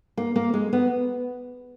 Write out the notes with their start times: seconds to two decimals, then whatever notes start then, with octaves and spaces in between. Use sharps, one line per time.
0.17 A#3
0.36 A#3
0.54 G#3
0.73 B3